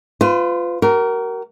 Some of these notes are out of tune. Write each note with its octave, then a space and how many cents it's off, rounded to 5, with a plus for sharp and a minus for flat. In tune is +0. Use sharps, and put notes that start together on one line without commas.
F4 +0 B4 +40
F#4 +45 A#4 +0